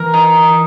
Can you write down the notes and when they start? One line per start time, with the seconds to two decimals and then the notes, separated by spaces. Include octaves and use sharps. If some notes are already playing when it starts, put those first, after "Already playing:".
Already playing: E3 A#4
0.14 D#4